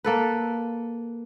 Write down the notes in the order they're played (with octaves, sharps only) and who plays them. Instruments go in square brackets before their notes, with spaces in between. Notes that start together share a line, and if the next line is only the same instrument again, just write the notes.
[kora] A#3 A4 B4